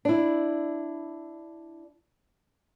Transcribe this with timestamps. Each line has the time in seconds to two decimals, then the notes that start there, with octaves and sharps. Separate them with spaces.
0.05 D4 E4